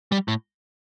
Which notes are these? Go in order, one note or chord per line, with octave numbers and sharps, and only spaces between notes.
G3
A2